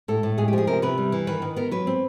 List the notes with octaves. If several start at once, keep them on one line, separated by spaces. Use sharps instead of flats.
A2 A4
A2
G#3 G#4
G4
F3 G#4
C3 A#4
C3 B4
G3
E3
D#3 B4
D#3
B3 A#4
F#3 B4
C4